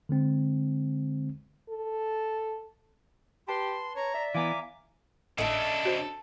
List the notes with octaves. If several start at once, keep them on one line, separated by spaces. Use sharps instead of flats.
D3 G#3 C4
A4
G4 B4 A5 B5 C6
C#5 A#5
D5 E5
E3 B3 F5 G#5 A#5 D6
G#1 A2 C#3 D4 A4 D#5 E5 C#7
F#4 C5 G6